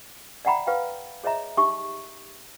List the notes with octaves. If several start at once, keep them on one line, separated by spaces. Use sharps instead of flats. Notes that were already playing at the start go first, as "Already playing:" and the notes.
D5 E5 F#5 G5 A#5 B5
B4 F5 G5
G#4 C#5 D#5 E5 A#5
D#4 G4 E5 C#6 D6